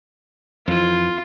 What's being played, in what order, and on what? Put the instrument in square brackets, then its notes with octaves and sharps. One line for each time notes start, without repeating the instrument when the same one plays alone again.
[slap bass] F2 E3 [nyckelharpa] F4